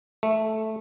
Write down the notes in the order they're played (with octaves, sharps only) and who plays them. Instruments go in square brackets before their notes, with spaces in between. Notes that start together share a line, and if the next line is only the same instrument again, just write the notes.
[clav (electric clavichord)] A3